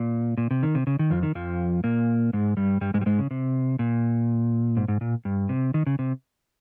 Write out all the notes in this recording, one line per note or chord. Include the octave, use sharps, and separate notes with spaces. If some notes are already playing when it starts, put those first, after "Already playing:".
Already playing: A#2
A#2
C3
D#3
C3
C#3
D#3
F2 F3
D#3
F2 F3
A#2 A#3
G#2 G#3
G2 G3
G2 G3
G#2 G#3
G3
G#2 G#3
C#3
C3
A#2
G#2
G#2
A#2
G2
C3
D#3
C#3
C3